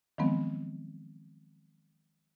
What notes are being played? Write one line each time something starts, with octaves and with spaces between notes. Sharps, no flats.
D#3 F3 F#3 G#3 B3 C4